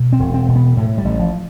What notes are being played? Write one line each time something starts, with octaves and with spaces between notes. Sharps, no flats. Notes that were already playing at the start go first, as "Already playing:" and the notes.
Already playing: B2
C4
E1
C4
B2
B3
A2
G3
A1
F3